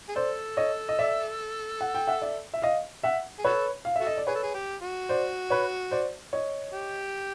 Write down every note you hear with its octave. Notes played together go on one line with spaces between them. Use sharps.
G#4
A4 C5 D5
C#5 D#5
D#5
D5 E5
F#5
G5
E5 F#5
D5 E5
E5
D#5 F5
E5 F#5
G#4
F#4 A4 B4 C#5
F5
F#4 A4 E5
D#5
D5
G#4 B4 C#5
A4
G#4
G4
F#4
C5 D5
B4 C#5
C5 D5
C#5 D#5
G4